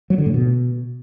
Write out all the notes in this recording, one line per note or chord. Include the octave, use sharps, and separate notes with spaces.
F#3
D3
A2
B2